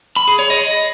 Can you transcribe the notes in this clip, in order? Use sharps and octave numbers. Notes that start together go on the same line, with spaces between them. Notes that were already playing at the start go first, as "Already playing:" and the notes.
B5
G#4
C#5
D#5